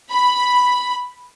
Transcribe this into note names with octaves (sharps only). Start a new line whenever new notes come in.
B5